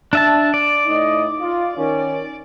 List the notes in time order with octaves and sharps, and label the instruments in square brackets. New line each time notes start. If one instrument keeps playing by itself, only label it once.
[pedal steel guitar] D4 E5 A5
D5
[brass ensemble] A2 D#4 D#5
F4
D#3 C#4